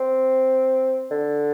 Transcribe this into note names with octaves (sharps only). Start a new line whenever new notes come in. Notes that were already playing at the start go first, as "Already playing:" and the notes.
Already playing: C4
D3